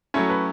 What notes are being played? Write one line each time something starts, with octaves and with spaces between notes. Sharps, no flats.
F#3 A3 C#4 E4 C#5
B4